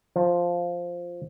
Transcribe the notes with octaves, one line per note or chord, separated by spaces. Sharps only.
F3